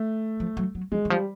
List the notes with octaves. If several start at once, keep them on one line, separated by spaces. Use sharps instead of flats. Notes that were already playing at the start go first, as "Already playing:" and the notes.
Already playing: A3
F3
F#3
F#3
F3 G#3
E3
F3 G3